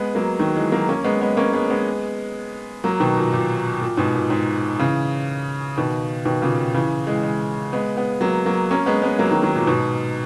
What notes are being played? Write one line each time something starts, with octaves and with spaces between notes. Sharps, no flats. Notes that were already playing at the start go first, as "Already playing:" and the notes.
Already playing: G#3 B3
F#3 A#3
D#3 F#3
E3 G#3
F#3 A#3
A#3 C#4
G#3 B3
G#3 B3
A#3 C#4
G#3 B3
G#3 B3
F#3 A#3
B2 D#3
A#2
A#2
A#2
G#2 B2
A#2
G#2
C#3 E3
B2 D#3
B2 D#3
A#2 C#3
C#3 E3
E3 G#3
E3 G#3
G#3 B3
G#3 B3
F#3 A#3
F#3 A#3
A#3 C#4
G#3 B3
G#3 B3
F#3 A#3
D#3 F#3
D#3 F#3
A#2
G#2 B2